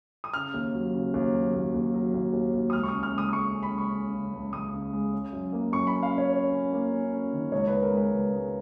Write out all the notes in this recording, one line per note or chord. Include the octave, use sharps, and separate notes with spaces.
D#6
C#3 F6
D#2
F#3
C#3
D#2
F#3
D#2
D#2
F#3
D#2
D#2
D#2
D#6
C#2 F6
C#6
C#4 D#6
F6
C#2 D#6
D#6
G#3 C#6
C#4
B5
C#2 C#6
C#4
C#3
C#2
C#2 D#6
C#3
G#3
C#4
F#2
A#3
F#2 C#6
B5
C#4
F5
C#4
C#5
C#4 C#5
C#4
A#3
C#4
C#4
D#3
C#2 C#5
B3 B4
A#4
G#3 B4
C#2
G#3